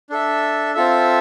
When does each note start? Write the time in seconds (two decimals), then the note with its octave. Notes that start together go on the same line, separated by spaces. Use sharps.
0.10 D4 A4 E5
0.74 C4 F4 A4 E5